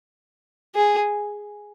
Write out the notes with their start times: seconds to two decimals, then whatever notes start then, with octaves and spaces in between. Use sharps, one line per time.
0.75 G#4